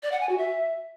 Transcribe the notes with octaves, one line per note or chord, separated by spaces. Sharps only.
D5
F#5
G#5
F#4
E5